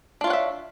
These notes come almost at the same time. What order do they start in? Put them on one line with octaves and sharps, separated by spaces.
D4 F4 C#5 F#5 E5